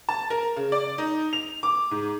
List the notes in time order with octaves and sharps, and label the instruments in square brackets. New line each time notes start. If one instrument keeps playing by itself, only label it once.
[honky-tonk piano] A5
A#4
C#3
D5
D#4
F7
D6
G#2